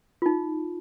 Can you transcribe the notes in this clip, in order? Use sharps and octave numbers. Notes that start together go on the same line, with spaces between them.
D#4 F4